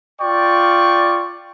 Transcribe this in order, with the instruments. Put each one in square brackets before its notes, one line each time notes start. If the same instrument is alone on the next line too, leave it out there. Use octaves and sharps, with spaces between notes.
[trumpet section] F4 D5 G5 C#6